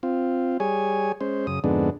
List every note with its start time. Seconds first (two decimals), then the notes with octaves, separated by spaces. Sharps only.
0.03 C4 F4
0.60 G3 G#4 C#5 G#5
1.21 G#3 C#4 C5
1.47 F#2 C#3 D#6
1.64 F2 G#2 D3 G#3 B3 D4